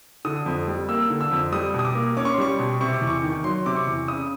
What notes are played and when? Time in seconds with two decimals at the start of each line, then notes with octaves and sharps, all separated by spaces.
0.25 D3 D#6
0.46 F2
0.67 G3
0.89 A#3 E6
1.10 D3
1.21 E6
1.31 F2
1.52 G3 D#6
1.74 B2
1.79 D#6
1.85 D6
1.95 A#3
2.17 C#4 D6
2.25 C#6
2.33 C6
2.38 G3 C#6
2.59 B2
2.81 C3 C#6
2.93 D6
3.02 E2
3.07 C#6
3.23 D#3
3.44 F#3 C6
3.66 C3 D6
3.76 C#6
3.87 E2
4.08 C#3 D#6